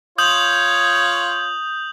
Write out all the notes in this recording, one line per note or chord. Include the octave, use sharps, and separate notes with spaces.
F4 C#5 D#6 G6 F#7